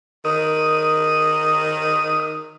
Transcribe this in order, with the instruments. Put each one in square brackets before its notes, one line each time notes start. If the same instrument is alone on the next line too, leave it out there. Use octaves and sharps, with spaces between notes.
[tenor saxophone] D#3 [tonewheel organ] D#6